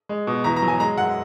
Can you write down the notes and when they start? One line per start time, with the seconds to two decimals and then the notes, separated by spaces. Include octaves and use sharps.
0.09 G#3
0.27 B2
0.44 E2 A#5
0.56 A#5
0.62 F#3
0.68 G#5
0.80 G#3 A#5
0.98 F#2 F#5